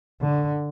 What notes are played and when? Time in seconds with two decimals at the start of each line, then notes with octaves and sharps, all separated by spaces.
0.21 D3